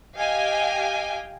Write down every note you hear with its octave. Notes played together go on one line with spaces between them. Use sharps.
G4 D#5 F5 G5 G#5